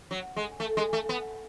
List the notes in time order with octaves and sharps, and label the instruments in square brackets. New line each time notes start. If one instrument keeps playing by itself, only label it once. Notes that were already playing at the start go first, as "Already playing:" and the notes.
[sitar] F#3
G#3
A3
G#3
A3
B3